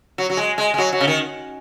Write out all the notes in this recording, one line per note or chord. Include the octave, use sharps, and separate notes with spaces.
F#3
F#3
G#3
G#3
G#3
F#3
F#3
C#3
D#3